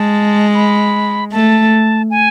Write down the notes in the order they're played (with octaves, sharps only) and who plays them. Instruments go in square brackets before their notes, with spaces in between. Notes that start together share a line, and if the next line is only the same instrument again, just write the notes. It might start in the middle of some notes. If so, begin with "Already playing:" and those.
Already playing: [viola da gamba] G#3 [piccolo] A5
[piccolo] B5
[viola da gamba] A3 [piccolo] A5
[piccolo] G#5